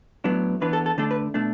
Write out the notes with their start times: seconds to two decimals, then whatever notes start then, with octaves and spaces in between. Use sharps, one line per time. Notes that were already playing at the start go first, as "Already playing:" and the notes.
0.24 A2 F#3 B3 D4
0.61 E3 B3 D4 B4
0.73 A4
0.86 A4
0.98 D3 A3 D4 A4
1.11 B4
1.34 B2 A3 D4